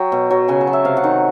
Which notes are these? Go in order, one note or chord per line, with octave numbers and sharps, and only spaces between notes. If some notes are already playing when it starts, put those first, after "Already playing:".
Already playing: F#3 G5
B2
F#3
C#3 G#5
A5
F#3
E5
C3 F5
F#5
D#3